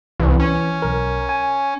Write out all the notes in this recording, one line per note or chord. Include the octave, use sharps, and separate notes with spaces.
C2 E3
C#4
B1 A#4
G#5